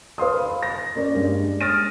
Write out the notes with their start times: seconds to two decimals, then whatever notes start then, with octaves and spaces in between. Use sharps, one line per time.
0.18 B4 F5 C6 D#6
0.37 B5
0.63 A#6
0.95 A#3 C#4 A#4 D5
1.15 G2 G#3
1.61 D#6 F6 A6 A#6 D7 D#7